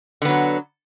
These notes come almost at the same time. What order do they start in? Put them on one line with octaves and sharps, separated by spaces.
D3 B3 F#3